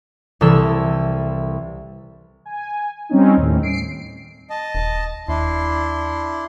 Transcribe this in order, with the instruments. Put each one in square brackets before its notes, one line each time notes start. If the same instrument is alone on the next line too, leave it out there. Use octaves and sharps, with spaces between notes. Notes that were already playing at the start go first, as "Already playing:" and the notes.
[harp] C2 E3 A4 E6 E7
[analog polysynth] G#5
G3 C4 C#4 D#4
D#2 A2
C7 D7
[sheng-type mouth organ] D#5 A5
[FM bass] D#1
[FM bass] D#2 [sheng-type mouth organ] D4 E4 C6